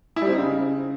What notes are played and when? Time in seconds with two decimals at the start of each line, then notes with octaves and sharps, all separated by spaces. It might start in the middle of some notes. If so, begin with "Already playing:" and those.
0.16 E4
0.22 G3
0.27 C4
0.33 D#4
0.38 C#3